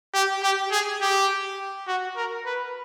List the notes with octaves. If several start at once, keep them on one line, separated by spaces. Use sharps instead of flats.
G4
G4
G#4
G4
F#4
A#4
B4